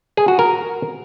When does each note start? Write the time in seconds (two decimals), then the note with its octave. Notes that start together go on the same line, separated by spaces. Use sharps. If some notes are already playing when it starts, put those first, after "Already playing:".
0.17 G#4
0.28 F#4
0.39 A#4